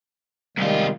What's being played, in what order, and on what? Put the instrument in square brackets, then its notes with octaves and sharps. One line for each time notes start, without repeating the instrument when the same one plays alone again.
[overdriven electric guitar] C2 F4 [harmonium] D#3 G3 G#3